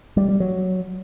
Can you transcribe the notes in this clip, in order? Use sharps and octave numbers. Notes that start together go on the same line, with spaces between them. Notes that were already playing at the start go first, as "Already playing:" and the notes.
G3
G3
F#3